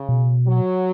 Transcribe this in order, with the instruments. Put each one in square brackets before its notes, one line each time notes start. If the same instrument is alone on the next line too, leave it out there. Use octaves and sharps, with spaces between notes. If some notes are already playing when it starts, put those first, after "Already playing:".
Already playing: [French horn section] C#3
[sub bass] B2
[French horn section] F#3